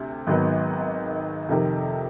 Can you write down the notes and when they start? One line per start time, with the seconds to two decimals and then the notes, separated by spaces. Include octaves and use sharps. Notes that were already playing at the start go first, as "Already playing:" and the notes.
Already playing: D2 C3
0.27 G#1 G#2 D#3 F#3 B3
1.49 F2 C3 D#3